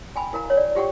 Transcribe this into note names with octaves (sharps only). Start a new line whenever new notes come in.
G5 G#5 B5
E4 A#4 F5 A#5
C#5 F5
D5
F4 G4 F#5 G5 C#6